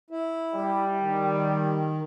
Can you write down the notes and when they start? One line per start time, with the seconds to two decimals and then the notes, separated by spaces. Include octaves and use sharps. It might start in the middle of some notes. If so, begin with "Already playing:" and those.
0.10 E4
0.54 G3
1.00 D#3